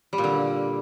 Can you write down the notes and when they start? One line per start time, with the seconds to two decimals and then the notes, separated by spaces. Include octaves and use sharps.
0.13 G3
0.18 A#2
0.24 D3